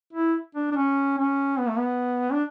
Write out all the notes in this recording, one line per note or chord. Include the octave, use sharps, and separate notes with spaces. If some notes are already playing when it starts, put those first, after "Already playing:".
E4
D4
D4
C#4
C#4
B3
A3
B3
D4